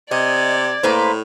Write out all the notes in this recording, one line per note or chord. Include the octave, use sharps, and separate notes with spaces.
C3 D5 D#5 G#6
A2 A#3 B4 C5